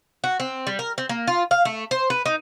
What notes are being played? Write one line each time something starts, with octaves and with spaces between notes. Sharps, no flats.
F#4
C4
G3
A#4
C4
A#3
F4
F5
A3
C5
B4
D#4